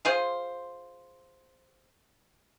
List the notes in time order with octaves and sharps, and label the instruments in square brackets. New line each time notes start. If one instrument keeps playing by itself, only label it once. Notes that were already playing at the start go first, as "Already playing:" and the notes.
[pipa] F4 G#4 C5